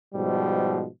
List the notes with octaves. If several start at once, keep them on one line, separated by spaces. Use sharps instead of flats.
G#2 B2 F3 G3